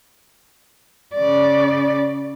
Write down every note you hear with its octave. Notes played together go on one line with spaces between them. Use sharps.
C#3 D5